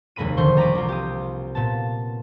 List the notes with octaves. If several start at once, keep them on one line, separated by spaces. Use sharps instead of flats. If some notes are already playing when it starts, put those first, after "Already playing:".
F1 D#2 G#3 A#3 B5 D#7
E1 D3 D#3 C5 C6 C#6
G3 A#5 B5 D6 D#7
C2 F4
G4 D#6
A#2 B3 A5